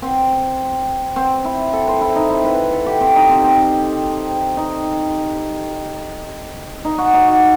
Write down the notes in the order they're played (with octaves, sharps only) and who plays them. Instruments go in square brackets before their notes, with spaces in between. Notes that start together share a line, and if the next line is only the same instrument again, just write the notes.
[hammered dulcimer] C4
C4
E4
A4
C5
E4
D#4
E4
B4
A4
G4
C4
D#4
C4
C4
D#4
D#4
F#4
D#4
F#4